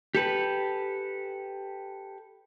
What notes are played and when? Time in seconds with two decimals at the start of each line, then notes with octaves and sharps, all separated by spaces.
0.15 G4 A4 B4